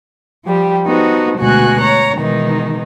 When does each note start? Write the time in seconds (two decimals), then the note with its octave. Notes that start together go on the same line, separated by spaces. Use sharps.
0.45 F3 G3 G4
0.87 B3 D#4 F#4 A4 C5
1.39 D2 B2 G#3 F#4 G#5 F#6
1.80 C#5 A#5
2.18 B2 D#3 E3 G#3 D#4